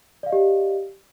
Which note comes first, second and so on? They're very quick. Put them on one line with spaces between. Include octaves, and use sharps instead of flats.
D5 F5 D#5 G4